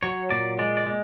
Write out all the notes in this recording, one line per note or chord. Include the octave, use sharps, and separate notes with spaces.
F#3 C#5
A#2 D5
G#3 D5
D5
G#3